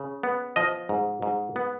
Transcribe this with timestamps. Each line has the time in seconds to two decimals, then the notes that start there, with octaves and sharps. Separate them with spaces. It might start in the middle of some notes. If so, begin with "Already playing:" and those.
Already playing: C#3
0.23 B3
0.56 F3 D#5
0.89 G#2
1.22 G#2
1.56 B3